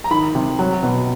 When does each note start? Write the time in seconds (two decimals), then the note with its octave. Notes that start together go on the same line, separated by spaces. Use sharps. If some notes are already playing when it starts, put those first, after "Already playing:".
0.04 A#5
0.11 D#3 B5
0.35 C3
0.59 F#3
0.83 B2